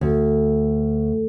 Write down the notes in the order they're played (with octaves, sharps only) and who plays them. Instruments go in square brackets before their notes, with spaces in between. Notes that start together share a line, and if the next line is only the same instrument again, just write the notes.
[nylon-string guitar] D2